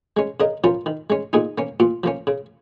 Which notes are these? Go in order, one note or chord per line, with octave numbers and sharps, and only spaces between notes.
G#3 C#4
C#3 A#4 D#5
F3 C#4 F4 A#4
D#3
G#3 C#4
A#2 D#4 G#4
A#3 C#4
A#2 F4
F3 A#3 C#4
C#3